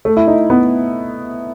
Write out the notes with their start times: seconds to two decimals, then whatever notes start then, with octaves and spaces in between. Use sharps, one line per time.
0.05 A3
0.17 E4
0.27 D#4
0.50 B3